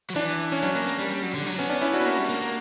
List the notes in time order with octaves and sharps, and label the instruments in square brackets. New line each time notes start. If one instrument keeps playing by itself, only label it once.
[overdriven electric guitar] F#3
[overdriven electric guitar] E3 [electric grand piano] D4
[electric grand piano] C#4
[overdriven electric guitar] F#3 [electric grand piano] D4
[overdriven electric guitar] A#3
A#3
G3
G3
F#3
D3
F#3
[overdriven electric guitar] B3 [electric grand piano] C#4
[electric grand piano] D4
C#4 E4
D4 F#4
[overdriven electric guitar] B3
A#3
G3
A#3
A#3